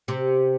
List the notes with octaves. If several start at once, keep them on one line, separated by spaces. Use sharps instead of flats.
C3